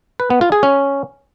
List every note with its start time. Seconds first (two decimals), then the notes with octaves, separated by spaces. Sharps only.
0.20 B4
0.30 B3
0.41 F4
0.52 G#4
0.63 C#4